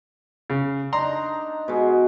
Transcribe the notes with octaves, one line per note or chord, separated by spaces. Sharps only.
C#3
D4 D#4 A#5 C6
B2 G#3